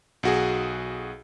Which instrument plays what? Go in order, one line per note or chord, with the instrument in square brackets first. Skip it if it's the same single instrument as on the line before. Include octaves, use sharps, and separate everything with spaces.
[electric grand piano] B1 F#4 G#4